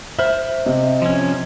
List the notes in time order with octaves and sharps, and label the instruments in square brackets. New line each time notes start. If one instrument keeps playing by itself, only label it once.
[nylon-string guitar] C5 E5 [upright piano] F6 F#7
[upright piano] C3 [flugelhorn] D#5
[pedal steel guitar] F3 C#4